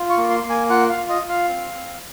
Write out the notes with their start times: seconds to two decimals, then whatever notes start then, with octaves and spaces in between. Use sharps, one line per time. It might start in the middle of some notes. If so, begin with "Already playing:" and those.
Already playing: F4
0.10 C#6
0.17 A#3
0.30 C6
0.44 A#3
0.50 G#5
0.69 F4 F#5
0.89 F5
0.96 F4
1.09 D#5
1.22 F4
1.29 F5
1.48 C4
1.74 C4